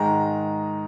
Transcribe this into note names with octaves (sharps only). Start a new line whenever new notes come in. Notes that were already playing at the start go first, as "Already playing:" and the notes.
Already playing: G#2 D#3 G#3 A#5